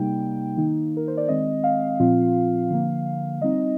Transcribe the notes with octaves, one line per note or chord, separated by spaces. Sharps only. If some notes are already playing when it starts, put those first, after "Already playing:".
Already playing: C3 G3 A#3 D#4 G5
D#3 A#3 D#4
A#4
C5
D5
D#3 G#3 C4 D#5
F5
A#2 F3 C4 F4
D3 F3 A#3
G3 C4 D#4 D#5